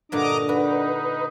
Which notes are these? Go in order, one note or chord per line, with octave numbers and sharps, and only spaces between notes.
G2 A#2 D3 D4 D#5 A#5 D6
D#4 F#4 B4